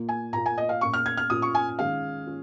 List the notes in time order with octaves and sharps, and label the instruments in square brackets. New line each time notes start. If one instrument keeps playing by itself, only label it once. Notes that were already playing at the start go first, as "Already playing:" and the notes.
Already playing: [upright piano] A#2 A#3 F4
[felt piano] G#5
[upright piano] A#2 A#3 F4 [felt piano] A#5
[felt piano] G#5
D#5
F5
[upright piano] A#2 A#3 C#4 F4 [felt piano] C#6
[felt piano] F6
G#6
F6
[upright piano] A#2 A#3 C#4 F4 [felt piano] D#6
[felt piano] C#6
G#5
[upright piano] D#3 G#3 C#4 F4 [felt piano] F5
[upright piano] C#4 F4